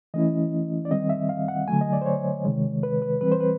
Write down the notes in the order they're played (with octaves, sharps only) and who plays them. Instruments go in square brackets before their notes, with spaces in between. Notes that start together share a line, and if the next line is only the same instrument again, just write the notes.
[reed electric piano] E3 A3 C#4 E4 D#5
D5
D#3 G3 C4 D#5
E5
F5
F#5
D3 F#3 A3 G#5
D#5
D5
C5
C#5
C3 D#3 G#3
B4
B4
E3 G3 C4 B4
C5
B4